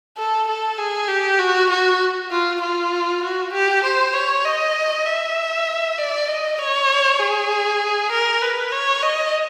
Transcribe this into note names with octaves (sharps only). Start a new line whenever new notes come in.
A4
A4
G#4
G4
F#4
F#4
F4
F4
F#4
G4
C5
C#5
D#5
E5
D5
D#5
C#5
G#4
A#4
B4
C#5
D#5